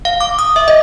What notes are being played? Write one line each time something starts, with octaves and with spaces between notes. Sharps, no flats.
F5
D6
D#6
E5
D#5